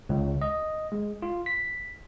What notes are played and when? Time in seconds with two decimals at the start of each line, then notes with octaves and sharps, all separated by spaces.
0.09 C#2
0.41 D#5
0.92 G#3
1.22 F4
1.46 B6